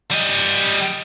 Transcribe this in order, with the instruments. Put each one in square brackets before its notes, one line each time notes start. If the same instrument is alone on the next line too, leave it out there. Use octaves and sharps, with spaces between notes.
[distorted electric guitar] G3 D#5